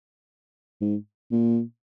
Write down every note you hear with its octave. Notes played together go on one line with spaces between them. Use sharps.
G#2
A#2